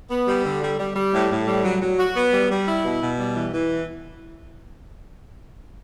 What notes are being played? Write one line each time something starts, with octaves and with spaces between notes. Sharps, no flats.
B3
G3
D3
G3
G3
G3
A2
A2
G3
F#3
F#3
F#4
B3
G3
G3
E4
B2
B2
G3
E3
E3